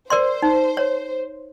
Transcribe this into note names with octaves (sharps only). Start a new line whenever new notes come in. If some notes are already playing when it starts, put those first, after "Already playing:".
A#4 C5 D5 C6
D#4
C#5